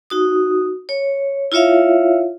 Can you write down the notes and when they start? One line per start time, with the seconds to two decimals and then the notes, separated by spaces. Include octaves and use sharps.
0.10 D#4 F#4 D#6
0.89 C#5
1.52 E4 F4 C#5 E5 F5